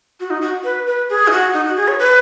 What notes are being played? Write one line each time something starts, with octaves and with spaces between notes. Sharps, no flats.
F#4
D#4
F#4
B4
B4
G#4
D#4
F#4
D#4
F#4
G#4
C#5
B4